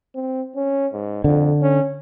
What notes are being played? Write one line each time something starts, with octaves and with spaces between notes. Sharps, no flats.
C4
C#4
G#2
F2 D3
C#4